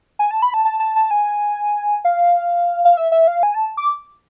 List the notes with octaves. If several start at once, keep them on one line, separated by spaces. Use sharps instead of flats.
G#5
A5
B5
A5
A5
A5
A5
G#5
F5
F5
E5
E5
F5
G#5
A5
D6